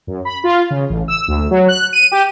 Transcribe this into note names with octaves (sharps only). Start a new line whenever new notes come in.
F#2
B5
F4
C#3
A1
E6
D2
F#3
F#6
D#7
G4